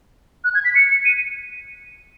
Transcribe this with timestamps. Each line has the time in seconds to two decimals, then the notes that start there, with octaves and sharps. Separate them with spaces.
0.44 F#6
0.55 G#6
0.65 B6
0.75 C#7
0.90 C#7
1.05 D#7